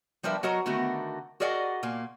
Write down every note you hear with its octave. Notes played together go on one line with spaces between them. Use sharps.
F3 G3 D4 A#4 B4 E5
F#3 F#4 A#4 D#5 A#5
D3 D#3 A3 B3 F#4 A#4
F#4 G#4 A#4 D5 D#5 F#5
A#2 A#3